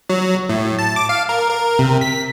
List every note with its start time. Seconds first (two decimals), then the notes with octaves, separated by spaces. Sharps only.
0.09 F#3
0.49 A2
0.79 A5
0.96 D6
1.09 F5
1.29 A#4
1.49 A#4
1.79 C3
2.01 B6